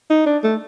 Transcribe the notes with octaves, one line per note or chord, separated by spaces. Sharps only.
D#4
D4
A3